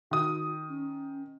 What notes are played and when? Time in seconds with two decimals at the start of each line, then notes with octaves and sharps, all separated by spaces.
0.11 D#3 F#4 D#6
0.69 C#4